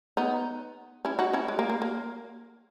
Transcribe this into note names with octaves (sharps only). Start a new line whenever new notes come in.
B3 D#4
C#4 E4
D#4 F#4
C#4 E4
G#3
A#3
A#3
A#3